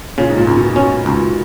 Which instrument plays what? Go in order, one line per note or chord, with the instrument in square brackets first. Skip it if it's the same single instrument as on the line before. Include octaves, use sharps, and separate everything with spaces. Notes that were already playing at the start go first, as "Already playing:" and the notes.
[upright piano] A#2 [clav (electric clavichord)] C#3
[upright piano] G#2
A#2
[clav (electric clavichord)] C#2
[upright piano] B2
[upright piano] B2 [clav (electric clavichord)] C#4
[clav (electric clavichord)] C#2